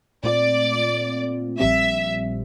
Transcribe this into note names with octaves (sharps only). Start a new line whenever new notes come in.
A#2 A3 C4 F4 D5
A#1 A#2 G3 C4 E5